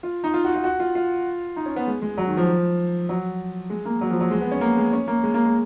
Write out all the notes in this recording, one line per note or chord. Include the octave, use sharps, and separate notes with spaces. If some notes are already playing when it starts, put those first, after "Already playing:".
F4
D#4
F4
F#4
F4
F#4
F4
F4
D#4
C#4
B3
G#3
G#3
F#3
D#3
F3
F#3
G#3
A#3
F#3
F3
F#3
G#3
B3
C#4
A#3
G#3
C#4
A#3
G#3
A#3
G#3